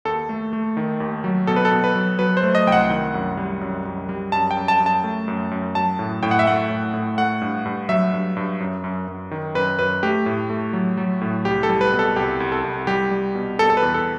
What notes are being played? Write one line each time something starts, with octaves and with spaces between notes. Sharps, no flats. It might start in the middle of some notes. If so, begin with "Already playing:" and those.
D#2 A4
A3
A3
D#3
D#2
F#3
B2 A4
B4
A4
B2
B4
F#3
F#3 B4
C5
A3
D#5
C2 G5
F#5
D#3
F#2
G3
F#2
F#2
G3
F#2 A5
G5
F#2
A5
F#2
A5
A3
F#2
F#2
F#3 A5
A2
A2 G5
F#5
E5
A3 F#5
A2
A2
A3 F#5
G2
G2
F#3 E5
G2
G2
F#2
F#2
F#2
D#3
F#2 B4
F#2 B4
A3 G4
A2
A3
F#3
F#3
A2
C2 G4
A4
G3
B4
B2
A4
C2 G4
C2
A4
C2
G3 G4
G3
B2
B2 A4
A4
B4
E2
A4